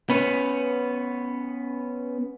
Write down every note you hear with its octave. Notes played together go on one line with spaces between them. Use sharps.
B3 C#4